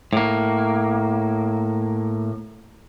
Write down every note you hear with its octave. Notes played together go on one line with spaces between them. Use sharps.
A2 A#3